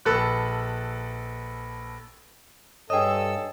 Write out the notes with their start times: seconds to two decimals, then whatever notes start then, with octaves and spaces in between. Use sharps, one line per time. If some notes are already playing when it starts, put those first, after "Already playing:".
0.05 A#1 A4 B4 F#6
2.90 G2 G#4 A4 C#5 D#5 G5 E6